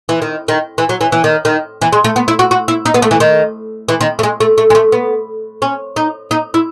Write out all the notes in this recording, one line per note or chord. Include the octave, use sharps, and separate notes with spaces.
E3
D#3
D#3
E3
F#3
E3
E3
D#3
D#3
E3
G#3
A3
B3
E4
F#4
F#4
E4
D#4
B3
A3
E3
D#3
E3
D#3
A3
G#3
A3
A3
G#3
A3
B3
C#4
D#4
D#4
E4